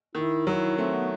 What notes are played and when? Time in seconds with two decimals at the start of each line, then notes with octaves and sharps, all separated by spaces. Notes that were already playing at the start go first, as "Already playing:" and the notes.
0.15 D#3 E4
0.47 F#3 E4
0.78 A3 C4
0.94 B3